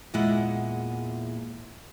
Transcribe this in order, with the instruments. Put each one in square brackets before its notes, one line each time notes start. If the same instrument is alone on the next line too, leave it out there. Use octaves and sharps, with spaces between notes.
[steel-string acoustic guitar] E2 A#2 G#3 E4 F#5 G#5